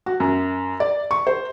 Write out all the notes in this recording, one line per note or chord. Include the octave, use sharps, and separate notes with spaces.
F#4
F#2
D5
C#6
C5